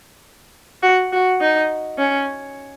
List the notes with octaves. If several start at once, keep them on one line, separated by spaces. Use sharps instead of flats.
F#4
F#4
D#4
C#4